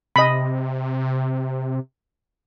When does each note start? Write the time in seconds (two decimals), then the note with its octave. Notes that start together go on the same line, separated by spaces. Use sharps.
0.16 C3 D#5 B5